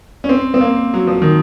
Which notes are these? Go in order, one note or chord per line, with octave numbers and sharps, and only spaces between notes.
C#4
C4
C4
A#3
F#3
F3
D#3